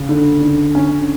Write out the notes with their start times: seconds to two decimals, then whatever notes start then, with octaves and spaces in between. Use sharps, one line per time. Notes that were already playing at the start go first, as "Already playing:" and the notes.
Already playing: C#3
0.09 D3
0.42 D3
0.75 D3 C#4